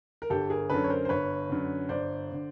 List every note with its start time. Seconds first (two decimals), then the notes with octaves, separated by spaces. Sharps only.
0.22 A#4
0.30 G1 G4 A4
0.50 G#4 A#4
0.69 F#2 D3 A4 B4
0.84 C#5
0.90 A#4 C5
1.05 C5
1.09 G1 B4 C#5
1.50 F#2 D3
1.89 G1 C5 D5
2.32 D3